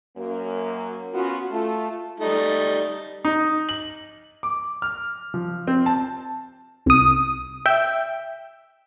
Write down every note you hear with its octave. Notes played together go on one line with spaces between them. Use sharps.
F#2 A#3
B3 C#4 F4 F#4
A3 F4
G3 A3 D#4
D#4
F#7
D6
F6
F3
C4
A5
C2 D#6
E5 G5